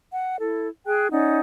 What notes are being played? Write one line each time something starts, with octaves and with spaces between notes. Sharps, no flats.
F#5
E4 A4
G#4 G5 G#5 F#6
C#4 D#4 D5 F#5